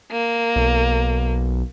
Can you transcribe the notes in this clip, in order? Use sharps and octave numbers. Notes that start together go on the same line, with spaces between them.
A#3
B1